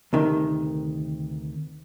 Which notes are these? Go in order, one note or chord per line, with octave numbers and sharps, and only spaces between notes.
D2 C3 D#3